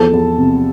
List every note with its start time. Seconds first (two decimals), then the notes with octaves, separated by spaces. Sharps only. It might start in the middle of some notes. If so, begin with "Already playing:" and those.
Already playing: E2 F3 A4 A5
0.13 E2
0.38 C3